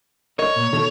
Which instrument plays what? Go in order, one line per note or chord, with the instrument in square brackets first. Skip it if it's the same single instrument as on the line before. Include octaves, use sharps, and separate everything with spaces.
[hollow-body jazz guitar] A#4 D#5 [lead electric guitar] C#5
[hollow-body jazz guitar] A#2
B2 D#3 A4